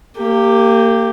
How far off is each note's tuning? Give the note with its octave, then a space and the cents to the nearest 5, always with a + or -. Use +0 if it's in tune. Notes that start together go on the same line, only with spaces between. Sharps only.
A#3 -30 G4 +0